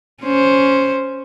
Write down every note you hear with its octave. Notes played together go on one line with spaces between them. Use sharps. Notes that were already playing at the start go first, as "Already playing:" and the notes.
C#4 C5